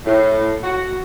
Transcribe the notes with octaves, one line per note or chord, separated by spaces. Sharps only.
A2
F#4